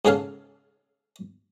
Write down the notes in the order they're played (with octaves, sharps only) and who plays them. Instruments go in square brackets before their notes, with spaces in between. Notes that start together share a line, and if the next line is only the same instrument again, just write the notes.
[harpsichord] G#2 C#3 G#4 A4 F5 A5